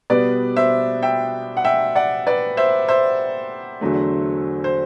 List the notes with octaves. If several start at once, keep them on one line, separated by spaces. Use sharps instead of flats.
B2 G3 B3 B4 D5
C5 E5
E5 G5
F#5
E5 G5
D5 F#5
B4 D5
C5 E5
C5 E5
E2 D3 F#3 A3
C5